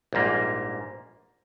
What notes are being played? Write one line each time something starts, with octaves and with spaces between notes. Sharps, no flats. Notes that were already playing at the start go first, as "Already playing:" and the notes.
A#1 G#2 G3 A#3